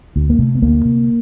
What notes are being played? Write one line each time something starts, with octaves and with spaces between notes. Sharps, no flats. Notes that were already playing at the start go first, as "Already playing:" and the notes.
D2
A#3
C3 A3
B3
D2 A#3
C3